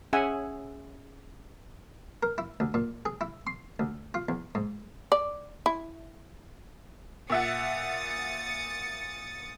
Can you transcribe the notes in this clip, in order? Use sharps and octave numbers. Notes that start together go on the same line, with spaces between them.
C#4 G#4 E5 F#5 G#5
A#4
E4
D2
A#2
G#4
E4
C6
D2
F4
E2
G#2
D5
E4
A#2 E5 F#5 D#6 A6 C#7